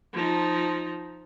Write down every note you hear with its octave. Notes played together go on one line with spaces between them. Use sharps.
F3 D#4